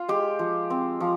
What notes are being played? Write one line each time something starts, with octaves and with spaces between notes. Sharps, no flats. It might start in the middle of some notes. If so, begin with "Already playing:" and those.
Already playing: F4
G#3 G4
F3
C4
F3